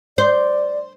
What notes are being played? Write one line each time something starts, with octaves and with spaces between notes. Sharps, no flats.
C5 D5